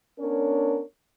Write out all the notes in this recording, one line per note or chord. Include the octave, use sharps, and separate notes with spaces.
B3 C#4 D4 A#4 C#5